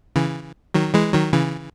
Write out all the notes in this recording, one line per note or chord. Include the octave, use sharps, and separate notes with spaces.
C#3 E3
D#3 F#3
E3 G#3
D#3 F#3
C#3 E3